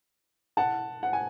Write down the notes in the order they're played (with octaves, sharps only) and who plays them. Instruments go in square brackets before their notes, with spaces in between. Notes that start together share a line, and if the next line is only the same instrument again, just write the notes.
[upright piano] F#5 A5
F#5
G#5